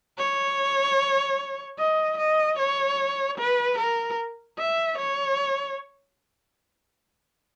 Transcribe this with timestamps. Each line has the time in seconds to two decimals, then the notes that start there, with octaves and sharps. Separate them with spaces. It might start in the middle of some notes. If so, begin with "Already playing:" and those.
0.18 C#5
1.78 D#5
2.18 D#5
2.58 C#5
3.38 B4
3.78 A#4
4.58 E5
4.98 C#5